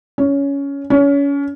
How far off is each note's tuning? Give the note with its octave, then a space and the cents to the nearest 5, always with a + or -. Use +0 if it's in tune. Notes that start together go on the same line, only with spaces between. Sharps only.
C#4 +15
C#4 +30